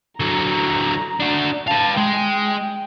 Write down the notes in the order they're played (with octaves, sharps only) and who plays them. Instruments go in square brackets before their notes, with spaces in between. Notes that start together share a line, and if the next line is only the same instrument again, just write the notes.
[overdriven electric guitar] D3 F#3 [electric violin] A#5
[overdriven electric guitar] D4 F#4
[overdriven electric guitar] B4 F5 [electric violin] A5
[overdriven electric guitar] G#3 [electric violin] G5